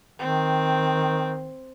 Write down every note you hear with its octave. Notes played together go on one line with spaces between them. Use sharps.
D#3 C4